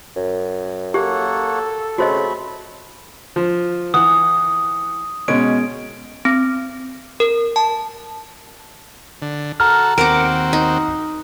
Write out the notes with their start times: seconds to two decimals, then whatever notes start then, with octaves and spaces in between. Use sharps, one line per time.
0.16 F#2
0.94 A#3 G4 A4 C#5 F#5
1.98 C#3 A3 C4 F#4 C5 D#5 B5
3.36 F3
3.94 E3 F#5 D#6
5.28 B2 G#3 C#4 D7
6.25 C4
7.20 A#4
7.56 A5
9.22 D3
9.60 F#4 A4 A#5 F6
9.98 D#2 C4 F#4 A#4 F#5 D6
10.53 D#4